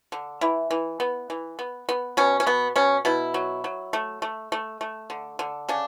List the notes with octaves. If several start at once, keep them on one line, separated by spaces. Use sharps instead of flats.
D3
E3 E4
E3
B3
E3
B3
B3
B2 C#4
C#4
B2 B3
B2 C#4
B2 E4
F#3
F#3
A3
A3
A3
A3
D3
D3
C#3 D4